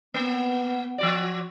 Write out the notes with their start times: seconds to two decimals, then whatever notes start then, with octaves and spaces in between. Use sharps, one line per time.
0.14 A#3 B3
0.98 F3 F#4 D5